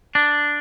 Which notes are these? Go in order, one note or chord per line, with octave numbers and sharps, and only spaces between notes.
D4